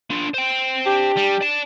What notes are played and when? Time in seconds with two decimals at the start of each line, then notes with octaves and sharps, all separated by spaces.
0.10 D4 F4
0.34 C5 G5
0.85 D4 G4
1.16 G3
1.41 D5 A5